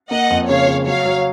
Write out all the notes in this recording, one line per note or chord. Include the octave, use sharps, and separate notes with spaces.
A#3 D#5 F#5
F2
C#3 C#5 F5
C#3
F#3 C#5 F5
F#3